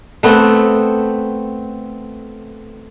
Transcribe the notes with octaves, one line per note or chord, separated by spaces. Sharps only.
A3 B3 C4